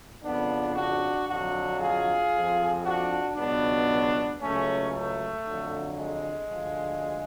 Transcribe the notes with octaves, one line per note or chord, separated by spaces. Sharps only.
F2 C#3 F3 B3 D4
D4 F#4
F2 D3 F#3 D4 F#4
F4 G#4
F2 F3
D4 F#4
C#2 B2 F#3 B3 D4
C#2 C#3 F#3 A3 C#4
A3
F2 D3 F#3
G#3
D2 D3 F3